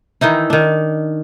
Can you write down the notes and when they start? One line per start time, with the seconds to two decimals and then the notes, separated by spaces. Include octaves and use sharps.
0.21 D#3 E3 D#4 E4
0.50 D#3 D4